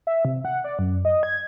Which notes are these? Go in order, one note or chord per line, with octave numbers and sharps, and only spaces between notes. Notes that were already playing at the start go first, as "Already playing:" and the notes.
E5
C3
F#5
D5
F#2
D#5
G#6